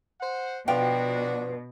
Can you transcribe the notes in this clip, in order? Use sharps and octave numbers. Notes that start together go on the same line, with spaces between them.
C5 F#5
B2 F3 D4 F#4 B4 F5 G5